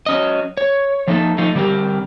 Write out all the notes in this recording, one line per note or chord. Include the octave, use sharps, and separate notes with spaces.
F#3 C#4 D#5
C#5
F3 A3 A#3 D#4 F#4 A4
F3 A3 D#4 F4
D3 G3 C4 G4 A#4